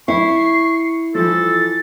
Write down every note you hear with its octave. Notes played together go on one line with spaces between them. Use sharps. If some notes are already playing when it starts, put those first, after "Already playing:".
E4 C#6 C7
E3 F3 A4 A6